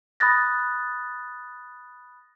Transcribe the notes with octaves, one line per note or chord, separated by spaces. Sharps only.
B5 D#6 F#6 A6 A#6